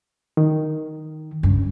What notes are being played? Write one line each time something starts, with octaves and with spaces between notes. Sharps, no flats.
D#3
G2 C#3